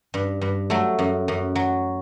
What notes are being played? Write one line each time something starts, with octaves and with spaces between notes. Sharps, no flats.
G2
G2
F#3 A3
F#2
F#2
F#3